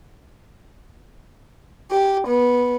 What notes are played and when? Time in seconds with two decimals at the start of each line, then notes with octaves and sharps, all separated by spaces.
1.90 G4
2.27 B3